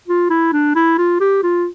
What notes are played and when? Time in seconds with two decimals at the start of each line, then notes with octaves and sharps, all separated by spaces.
0.08 F4
0.30 E4
0.53 D4
0.75 E4
0.98 F4
1.20 G4
1.43 F4